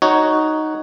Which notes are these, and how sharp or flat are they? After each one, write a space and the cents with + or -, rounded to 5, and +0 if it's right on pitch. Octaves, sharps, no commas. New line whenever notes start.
D#4 +0 F#4 +5 C#5 +0